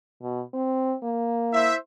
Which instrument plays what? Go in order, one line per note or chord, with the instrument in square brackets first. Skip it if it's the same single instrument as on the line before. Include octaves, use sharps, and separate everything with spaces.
[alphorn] B2
C4
A#3
[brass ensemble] E4 C5 E5